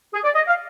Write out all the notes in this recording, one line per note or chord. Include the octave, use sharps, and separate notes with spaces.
G#4
D5
D#5
F5